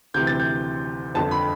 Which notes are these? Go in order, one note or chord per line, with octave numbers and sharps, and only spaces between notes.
D2 C3 E3 G6
A6
G6
G1 F2 D3 A5
B5